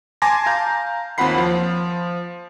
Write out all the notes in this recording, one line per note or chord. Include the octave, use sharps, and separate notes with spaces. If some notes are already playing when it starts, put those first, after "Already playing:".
G#5 A5 C6 D6 A#6
F5 A#5 G6
D#2 C4 F4 F#5 B5 C7
F3